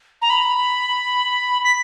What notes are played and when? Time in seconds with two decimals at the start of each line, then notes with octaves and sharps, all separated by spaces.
0.22 A#5
0.30 B5
1.64 B6